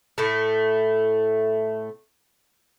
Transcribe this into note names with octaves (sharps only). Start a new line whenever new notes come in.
A2 A3